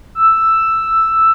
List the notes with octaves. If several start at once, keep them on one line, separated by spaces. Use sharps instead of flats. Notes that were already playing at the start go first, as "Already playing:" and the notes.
E6